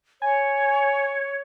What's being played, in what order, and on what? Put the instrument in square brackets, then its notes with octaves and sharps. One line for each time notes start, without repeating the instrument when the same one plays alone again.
[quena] C#5 [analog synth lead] G#5